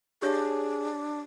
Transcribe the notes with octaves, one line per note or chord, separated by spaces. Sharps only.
D4 G4 G#4 C#5 F5